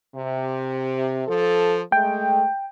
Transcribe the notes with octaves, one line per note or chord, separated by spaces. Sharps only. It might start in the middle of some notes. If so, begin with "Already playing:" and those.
C3
F3 A4
G#3 A3 G5